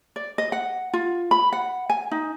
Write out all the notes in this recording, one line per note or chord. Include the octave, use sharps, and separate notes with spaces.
D5
D#5
F#5
F4
B5
F#5
G#5
D#4